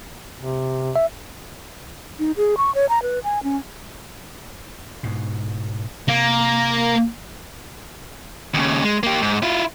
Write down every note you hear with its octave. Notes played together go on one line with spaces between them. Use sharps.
C3
E5
D#4
G#4
C#6
C#5
A#5
B4
G#5
C#4
G#2 B2
C3 A#3
D#2 C#3
G#3
A#3 G4
G#2
E4 F4